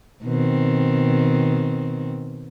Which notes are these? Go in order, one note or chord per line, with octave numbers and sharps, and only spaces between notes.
B2 D#3 C4